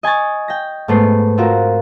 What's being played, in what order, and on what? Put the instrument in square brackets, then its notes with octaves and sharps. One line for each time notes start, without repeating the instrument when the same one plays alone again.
[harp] D#5 G#5 C#6 A6
G5 A#6
G#2 A3 B3 C7
C4 F4 F#4 A#4